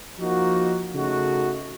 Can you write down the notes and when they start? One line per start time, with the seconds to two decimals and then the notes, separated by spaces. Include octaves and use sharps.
0.19 F3 A#3 D#4 F#4
0.93 C#3 A3 D#4 F#4